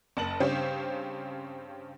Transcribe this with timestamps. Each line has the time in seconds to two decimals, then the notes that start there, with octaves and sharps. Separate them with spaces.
0.17 F#1 A5 F#7
0.40 G2 C#3 C4 C#4 G4 C5